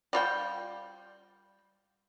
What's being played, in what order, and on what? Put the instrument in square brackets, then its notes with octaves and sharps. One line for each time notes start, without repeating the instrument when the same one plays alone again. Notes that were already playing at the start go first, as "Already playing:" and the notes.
[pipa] G3 F4 G5